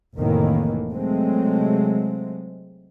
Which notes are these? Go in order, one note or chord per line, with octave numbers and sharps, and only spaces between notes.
F1 A2 D#3 E3 A#3
C3 F#3 G#3 A3 C4